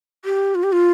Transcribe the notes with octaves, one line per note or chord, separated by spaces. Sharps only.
G4
F4
G4
F4